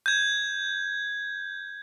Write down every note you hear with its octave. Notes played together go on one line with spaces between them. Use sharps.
G6 G#6